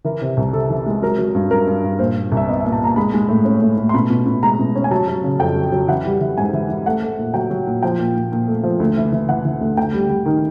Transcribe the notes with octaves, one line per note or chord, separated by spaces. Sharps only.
E3 A#4
C3
C2
C3 A4
E3
G#3
F#3 A#4
F#3
G2
G2 A#4
G2
G2
A#2 C5
A#2
C2
E5
B3 D#5
A#2 E5
A5
A#2 A#5
G#3 B5
G#3
A2
C#4
A2
A2
C6
B2 B5
B2
B2
G#3 A#5
B2
C#4
G#5
F#3 A5
F#3
C#3
F2 G5
F#3
F#3
E3 F#5
G3
E3
G#2 G#5
E3
E3
A3 F#5
A3
A#2
F#3 G5
F#3
A#2
F3 G5
A#2
A#2
A#2
A3
F3
D2
E3
E3
E3 F#5
E3
D2
D2 G5
G3
G3
D#3